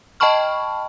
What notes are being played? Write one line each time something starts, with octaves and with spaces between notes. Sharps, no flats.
D#5 G5 A5 B5 C#6 F6